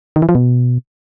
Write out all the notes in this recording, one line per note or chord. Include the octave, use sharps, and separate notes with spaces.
D#3
E3
F3
B2